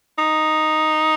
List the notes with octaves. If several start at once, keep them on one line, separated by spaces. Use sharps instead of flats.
D#4